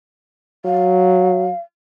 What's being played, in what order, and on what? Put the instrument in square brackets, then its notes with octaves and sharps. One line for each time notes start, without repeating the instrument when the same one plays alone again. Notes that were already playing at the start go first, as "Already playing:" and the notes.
[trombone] F#3 [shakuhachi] F5